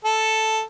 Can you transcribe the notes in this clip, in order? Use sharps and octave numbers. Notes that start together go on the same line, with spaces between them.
A4